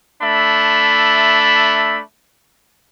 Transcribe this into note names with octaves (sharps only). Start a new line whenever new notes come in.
A3 D4 E5 B5